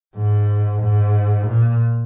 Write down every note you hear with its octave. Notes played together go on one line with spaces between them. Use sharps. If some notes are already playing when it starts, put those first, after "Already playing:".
G#2
G#2
A#2